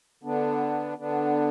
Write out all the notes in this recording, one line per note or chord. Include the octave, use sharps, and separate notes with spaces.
D3 B3 D4
D3 B3 D4